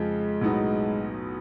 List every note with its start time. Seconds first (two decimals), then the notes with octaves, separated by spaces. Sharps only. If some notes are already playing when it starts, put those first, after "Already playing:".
Already playing: F2 C#3 F3 G#3
0.41 B1 A2 F#3 B3 D#4